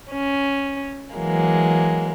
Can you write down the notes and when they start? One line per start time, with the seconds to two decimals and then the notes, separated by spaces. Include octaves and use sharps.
0.11 C#4
1.16 E3 F#3 G#3 A#3